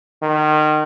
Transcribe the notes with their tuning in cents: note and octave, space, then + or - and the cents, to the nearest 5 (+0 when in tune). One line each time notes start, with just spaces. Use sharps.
D#3 -30